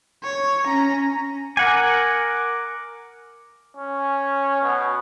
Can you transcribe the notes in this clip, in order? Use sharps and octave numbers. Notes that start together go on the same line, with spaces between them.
C#5
C#4 A#5
A#4 F#5 G#5 D6
C#4
B2